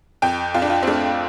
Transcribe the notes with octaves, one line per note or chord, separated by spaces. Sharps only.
F2 G5
F2 F4
D4
F4
C4
A3 D4